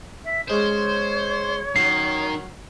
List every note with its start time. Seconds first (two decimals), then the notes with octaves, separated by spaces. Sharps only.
0.25 E5
0.50 G#3 C#4 C5 C#5
1.76 D#3 F#3 C#4 C7